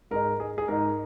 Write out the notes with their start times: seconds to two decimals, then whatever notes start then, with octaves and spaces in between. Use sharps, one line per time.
0.11 G#2 G#3 D#4 A#4
0.40 G#4
0.58 G#4
0.68 G#2 G#3 D#4 A#4